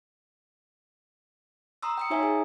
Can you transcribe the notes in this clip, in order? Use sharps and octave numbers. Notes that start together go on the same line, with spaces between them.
A#5 C6 D#6 E6
G5 D#6 C#7
D#4 F#4 C#5 E5 G#5 A#5
G#4